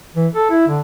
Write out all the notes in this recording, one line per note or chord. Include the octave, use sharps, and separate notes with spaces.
E3
A4
E4
D3